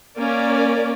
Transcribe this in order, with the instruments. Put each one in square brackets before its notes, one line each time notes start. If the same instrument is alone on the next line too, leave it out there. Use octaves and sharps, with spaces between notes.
[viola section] A#3 C#4 A#4 D5